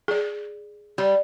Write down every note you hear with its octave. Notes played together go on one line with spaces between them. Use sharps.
G#4 D5
G3 D5